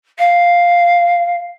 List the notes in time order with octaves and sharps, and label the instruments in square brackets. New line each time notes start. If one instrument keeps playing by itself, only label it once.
[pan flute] F5